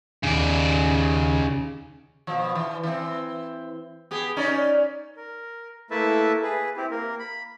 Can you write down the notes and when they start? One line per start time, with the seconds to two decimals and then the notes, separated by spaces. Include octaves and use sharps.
0.23 D#2 C#3 D5
2.27 B2 F3
2.55 E3
2.83 E3 C4
4.11 B3 G4 G#4
4.37 C#4 D#4 D5
5.17 A#4
5.90 A3 A#3 E4 B4 E5 A5
6.43 G#4 B4
6.77 C4 E4 G4
6.91 A#3 A#4
7.19 B5